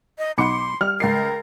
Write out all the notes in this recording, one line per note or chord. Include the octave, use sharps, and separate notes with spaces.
D#5
B1 D#4 F#5 B5 C6 D6 C#7
G3 F6
C#2 A#4 A6 C7